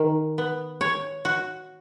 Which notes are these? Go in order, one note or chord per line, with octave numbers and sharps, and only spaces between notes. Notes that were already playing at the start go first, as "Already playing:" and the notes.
Already playing: D#3
B3
C#5
F#4